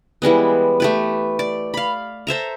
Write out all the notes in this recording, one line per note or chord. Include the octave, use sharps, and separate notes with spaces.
E3 G3 G#3 B3
A3 G4 B4
D5
F5 B5
A4 C5 E5 A#5